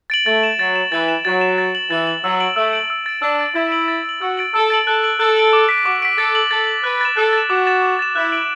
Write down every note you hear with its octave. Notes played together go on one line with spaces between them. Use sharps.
A6 D7 F#7
A3 A6
E7
F#3 A6
E7
E3 A6
E7
F#3 A6
E7
A6
F#7
E3 A6
F#7
F#3 E6
D7 F#7
A3 E6
D7 F#7
E6
A6 D7
D4 E6
A6 D7
E4 A6
D7 F#7
A6
D7 F#7
F#4 E6
A6 D7 F#7
A4 E6
A6 D7 F#7
A4 F#6
D7 F#7
A4 F#6
D7 F#7
D6
B6 D7
F#4 D6
B6 D7
A4 A6
F#7
A4 A6
F#7
B4 F#6
A6 E7
A4 F#6
A6 E7
F#4 D6
A6 E7
D6
A6 E7
E4 F#6
D7 F#7